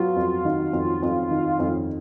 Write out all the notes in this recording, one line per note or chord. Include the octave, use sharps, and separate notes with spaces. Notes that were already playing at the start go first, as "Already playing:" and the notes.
Already playing: F#3 B3 F4
F2
D#3
F2
F2
D#3
F2